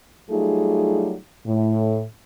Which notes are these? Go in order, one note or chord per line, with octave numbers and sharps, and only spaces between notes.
F#3 G3 A3 D#4 F4 G#4
A2